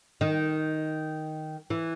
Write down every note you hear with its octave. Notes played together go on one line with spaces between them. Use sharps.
D#3
E3